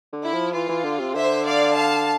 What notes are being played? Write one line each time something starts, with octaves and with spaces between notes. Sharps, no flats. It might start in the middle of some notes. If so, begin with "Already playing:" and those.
D3
E4
F3
E3 F4
E3
D3
C3
D3 C5 E5
D5 F5
F5 A5